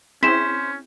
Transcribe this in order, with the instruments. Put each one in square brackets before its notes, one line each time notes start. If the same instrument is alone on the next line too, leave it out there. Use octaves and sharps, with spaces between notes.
[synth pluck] C4 E4 G#4 [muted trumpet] C#4 [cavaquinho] C5 [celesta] B6 E7